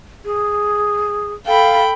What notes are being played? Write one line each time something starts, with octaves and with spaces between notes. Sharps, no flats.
G#4
A4 F5 G5 B5